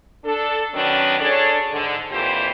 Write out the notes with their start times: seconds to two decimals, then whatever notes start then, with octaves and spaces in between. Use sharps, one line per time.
0.25 D4 A4
0.74 D#3 F#3 B3 C#4 D4
1.19 D4 G#4 A4 C#5 D5
1.72 G#2 D3
2.11 F2 A#2 E3 G4 C5